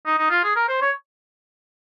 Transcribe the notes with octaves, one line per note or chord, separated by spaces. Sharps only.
D#4
D#4
F4
G#4
A#4
C5
C#5